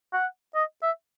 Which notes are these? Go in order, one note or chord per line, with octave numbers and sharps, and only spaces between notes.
F#5
D#5
E5